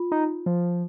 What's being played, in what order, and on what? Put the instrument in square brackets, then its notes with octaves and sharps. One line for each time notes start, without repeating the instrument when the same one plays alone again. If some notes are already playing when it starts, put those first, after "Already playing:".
Already playing: [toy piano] F4
[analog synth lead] D#4
F3